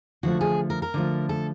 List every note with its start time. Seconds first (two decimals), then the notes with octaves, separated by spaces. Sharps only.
0.23 D3 F3 A3 F#4
0.41 G#4
0.70 A#4
0.82 A#4
0.94 D3 F3 A3
1.29 A4